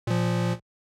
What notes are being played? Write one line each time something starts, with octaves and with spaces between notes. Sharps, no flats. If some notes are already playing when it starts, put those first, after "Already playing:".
A#2 F3